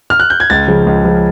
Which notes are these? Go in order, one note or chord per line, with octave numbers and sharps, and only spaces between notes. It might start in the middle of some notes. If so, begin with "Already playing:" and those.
F6
F#6
G6
G#6
C#2 A6
C#3 F3
C#2
C#3 F3